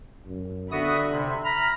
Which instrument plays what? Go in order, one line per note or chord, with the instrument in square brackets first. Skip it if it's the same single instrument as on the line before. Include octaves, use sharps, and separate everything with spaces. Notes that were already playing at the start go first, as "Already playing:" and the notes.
[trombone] F#2
[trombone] D3 [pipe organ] B3 F#4 D#6 [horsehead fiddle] E5 B5
[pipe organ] C3
[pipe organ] A#5 F6 [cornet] B5